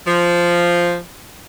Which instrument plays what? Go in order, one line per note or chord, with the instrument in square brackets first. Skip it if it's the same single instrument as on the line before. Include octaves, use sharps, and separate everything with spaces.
[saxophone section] F3